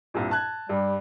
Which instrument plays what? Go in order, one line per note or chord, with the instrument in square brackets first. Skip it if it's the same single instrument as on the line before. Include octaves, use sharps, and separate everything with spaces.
[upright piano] C2 G2 A#2
A5 F#6 G#6
[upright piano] G2 [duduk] G3